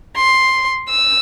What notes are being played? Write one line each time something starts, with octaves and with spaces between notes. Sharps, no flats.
C6
E6